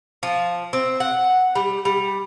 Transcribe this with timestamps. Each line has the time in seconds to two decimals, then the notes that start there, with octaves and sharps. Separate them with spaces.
0.23 F3
0.73 C4
1.00 F#5
1.55 G3
1.85 G3